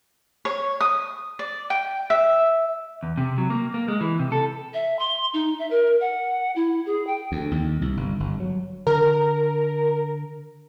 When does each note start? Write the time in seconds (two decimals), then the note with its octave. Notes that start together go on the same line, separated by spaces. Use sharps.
0.45 C#5
0.81 D#6
1.39 D5
1.70 G5
2.10 E5
3.03 E2
3.17 C3
3.38 F#3
3.50 A#3
3.74 A#3
3.88 G#3
4.01 E3
4.19 C3
4.32 A4
4.74 E5
4.99 C6
5.33 D#4
5.59 E5
5.71 A#4
6.01 F#5
6.56 E4
6.86 G#4
7.07 G5
7.32 D2
7.51 D#2
7.82 C2
7.97 G1
8.20 G1
8.40 F#3
8.87 D3 A#4